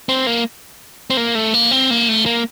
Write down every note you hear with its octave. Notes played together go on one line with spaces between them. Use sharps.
C4
A#3
C4
A#3
A3
A#3
C4
A#3
A3
A#3